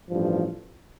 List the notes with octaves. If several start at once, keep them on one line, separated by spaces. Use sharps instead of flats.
A1 G2 F3